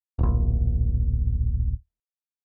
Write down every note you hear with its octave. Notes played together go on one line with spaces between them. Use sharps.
D1 A#1